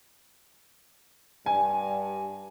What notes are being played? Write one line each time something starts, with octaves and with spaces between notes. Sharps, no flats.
G2 G#5